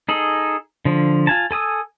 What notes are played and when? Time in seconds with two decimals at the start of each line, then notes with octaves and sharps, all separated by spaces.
0.09 D#4 G#4 A4
0.85 D3 F3
1.27 F4 G#5 A5
1.51 A4 G#5 D#6 E6